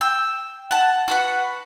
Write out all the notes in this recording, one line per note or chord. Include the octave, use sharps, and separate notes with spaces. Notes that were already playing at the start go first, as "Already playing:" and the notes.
G5 E6
F#5 A5
F#4 B4 F#5